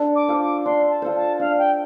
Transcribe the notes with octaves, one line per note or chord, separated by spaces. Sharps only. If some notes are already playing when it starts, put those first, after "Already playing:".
Already playing: D4 A4
D6
F4 A4 C5
D6
D4 C6
A5
F4 A4 C5
A5
D4 F5
G5